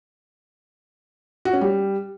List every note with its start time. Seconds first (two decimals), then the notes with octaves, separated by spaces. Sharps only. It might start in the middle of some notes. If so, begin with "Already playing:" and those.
1.45 F#4
1.53 C#4
1.61 G3